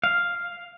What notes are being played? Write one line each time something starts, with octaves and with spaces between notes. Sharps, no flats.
F5